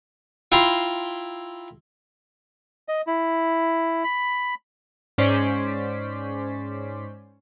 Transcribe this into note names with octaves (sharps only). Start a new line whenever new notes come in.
E4 F4 G5 A#5 C6
D#5
E4
B5
G#2 C#4 C5 D5 B6